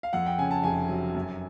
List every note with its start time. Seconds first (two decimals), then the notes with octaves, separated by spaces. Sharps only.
0.03 F5
0.13 F2 F#5
0.26 G5
0.38 C#3 G#5
0.51 A5
0.64 F1 G#5
0.89 F#3
1.15 F#2